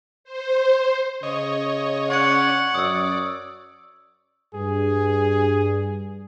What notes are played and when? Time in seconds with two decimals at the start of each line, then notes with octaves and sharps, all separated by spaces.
0.24 C5
1.23 C#3 C#5 D#5
2.10 C#4 D5 F#5 C#6 G#6 C#7
2.74 F#2 D5 D#6 E6
4.54 G2 G#4